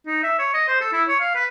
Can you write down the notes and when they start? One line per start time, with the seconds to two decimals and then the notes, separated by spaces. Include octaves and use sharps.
0.07 D#4
0.23 E5
0.39 C#5
0.54 D#5
0.68 C5
0.81 A4
0.93 E4
1.08 C#5
1.20 F5
1.35 B4